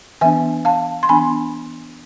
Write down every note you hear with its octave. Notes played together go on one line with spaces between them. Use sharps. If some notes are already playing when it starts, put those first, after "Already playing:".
E3 B3 D4 E5 G#5
F5 A5
C6
E3 B3 D4 G#5 B5